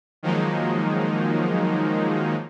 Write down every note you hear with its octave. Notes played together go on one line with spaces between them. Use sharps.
D#3 F3 F#3 G#3 A#3 D#4